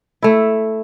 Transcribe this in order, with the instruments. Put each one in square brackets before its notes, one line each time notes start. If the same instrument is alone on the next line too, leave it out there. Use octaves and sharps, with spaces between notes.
[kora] A3 E4